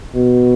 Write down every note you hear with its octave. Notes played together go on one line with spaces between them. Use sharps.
B2